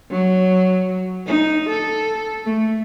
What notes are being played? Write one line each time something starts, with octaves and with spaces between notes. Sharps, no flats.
F#3
D#4
A4
A3